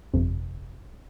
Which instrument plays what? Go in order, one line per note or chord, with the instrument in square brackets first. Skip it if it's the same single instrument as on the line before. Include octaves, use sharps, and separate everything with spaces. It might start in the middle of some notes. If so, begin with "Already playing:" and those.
[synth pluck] G1 F2 C3